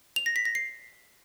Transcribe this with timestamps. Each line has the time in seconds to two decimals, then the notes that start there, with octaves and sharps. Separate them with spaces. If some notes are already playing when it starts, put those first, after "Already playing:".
0.16 F7
0.26 A#6
0.36 B6
0.45 A#6
0.55 C7